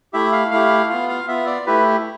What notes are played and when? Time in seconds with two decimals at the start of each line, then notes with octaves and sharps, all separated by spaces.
0.13 A3 E4 G4 E5
0.33 F5
0.51 A3 E4 G4 F5
0.90 B3 F4 F5
1.09 F5
1.27 B3 F4 E5
1.47 D5
1.66 A3 E4 G4 B4